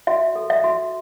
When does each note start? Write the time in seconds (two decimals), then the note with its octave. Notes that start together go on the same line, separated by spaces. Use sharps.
0.07 F#4 E5
0.35 A4
0.50 E5
0.64 F#4